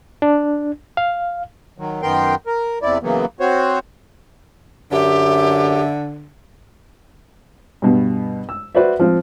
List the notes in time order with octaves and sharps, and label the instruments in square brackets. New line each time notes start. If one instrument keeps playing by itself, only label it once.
[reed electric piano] D4
F5
[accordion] D#3 F#3
F#2 D#3 B3 A#4 G5 C6
A#4
E2 C3 E4 D5
C#3 E3 F#3 A#3 B3
C4 F#4 C5 C#5
[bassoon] F#2 [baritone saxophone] D3 [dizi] G4 [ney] E5
[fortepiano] G2 B2
E6
F#4 B4 C5 D5 E5
F3 C4 F4